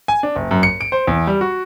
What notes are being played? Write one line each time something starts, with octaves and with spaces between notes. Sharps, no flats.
G#5
D4
F#1
F#2
C#7
D7
C5
E2
G3
F#4